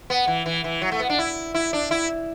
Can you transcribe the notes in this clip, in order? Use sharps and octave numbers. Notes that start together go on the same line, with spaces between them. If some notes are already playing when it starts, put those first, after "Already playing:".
B3
E3
E3
E3
F#3
A3
B3
D4
E4
E4
D4
E4